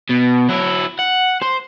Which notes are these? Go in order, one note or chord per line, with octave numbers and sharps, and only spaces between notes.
B2
F#3 E4
F#5
C5